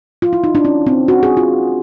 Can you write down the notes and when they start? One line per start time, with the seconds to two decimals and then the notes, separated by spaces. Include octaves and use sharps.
0.22 F4
0.33 E4
0.44 D#4
0.55 D4
0.65 C#4
0.87 C4
1.08 F#4
1.23 G#4
1.37 F4